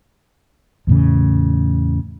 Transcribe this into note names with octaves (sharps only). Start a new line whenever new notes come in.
E2 A2 C#3